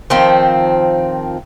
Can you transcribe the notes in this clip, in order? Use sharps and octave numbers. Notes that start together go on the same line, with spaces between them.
D#3 F3 C4